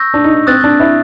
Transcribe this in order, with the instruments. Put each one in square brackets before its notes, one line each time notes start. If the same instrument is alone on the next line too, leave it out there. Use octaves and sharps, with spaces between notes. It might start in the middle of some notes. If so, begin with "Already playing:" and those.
Already playing: [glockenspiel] C#6 E6 G6 A#6
[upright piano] D4
D#4
[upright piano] C4 [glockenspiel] D#6 F#6 A6
[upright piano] D4
E4